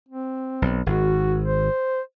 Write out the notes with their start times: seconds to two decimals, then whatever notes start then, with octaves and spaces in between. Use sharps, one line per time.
0.08 C4
0.62 B1
0.86 G#1 F#4
1.44 C5